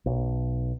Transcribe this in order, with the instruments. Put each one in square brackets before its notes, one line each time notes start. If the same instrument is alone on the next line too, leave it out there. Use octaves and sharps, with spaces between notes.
[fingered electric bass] B1